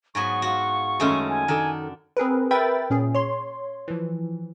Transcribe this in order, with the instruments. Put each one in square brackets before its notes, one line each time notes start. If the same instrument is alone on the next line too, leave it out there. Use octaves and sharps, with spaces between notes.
[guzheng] G#2 F#3 B3 [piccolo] C#6
[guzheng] F4 F#4
[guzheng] F#2 D#3 C6 [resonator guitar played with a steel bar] G#3 A3 C#4
[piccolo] G#5
[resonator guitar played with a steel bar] D#3 A4 [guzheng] D4
[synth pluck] C4 G#4 A#4 B4
A#4 B4 E5 G5 B5 A6
A#2 C#4 G#4
C#5 C6
E3 F3